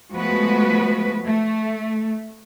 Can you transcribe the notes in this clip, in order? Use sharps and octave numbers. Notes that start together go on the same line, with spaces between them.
F3 G#3 A3 B3 F#4 B4
A3